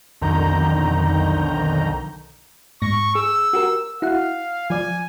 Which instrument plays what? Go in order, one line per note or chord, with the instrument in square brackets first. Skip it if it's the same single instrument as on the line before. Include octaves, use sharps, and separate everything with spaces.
[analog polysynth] B1 F2 D3 D#3 A#5 G6
[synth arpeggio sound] G#2 A#6 [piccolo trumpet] C#6
[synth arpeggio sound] G#4 [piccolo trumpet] E6
[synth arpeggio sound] F#4 G4 A#4
[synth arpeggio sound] E4 F#4 F#5 [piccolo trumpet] F5
[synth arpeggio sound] F3 D5 [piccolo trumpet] G#5